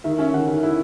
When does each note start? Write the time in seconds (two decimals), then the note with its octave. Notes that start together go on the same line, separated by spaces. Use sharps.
0.04 D#3 E5
0.18 C#4 E5
0.33 D#3 F#5
0.48 D#3
0.63 E4